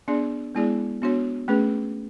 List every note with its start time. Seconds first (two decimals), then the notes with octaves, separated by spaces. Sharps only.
0.08 B3 D4 G#4 D5
0.55 G#3 B3 E4 G#4 D5
1.02 B3 D4 F#4 C#5
1.48 A3 C#4 G#4 B4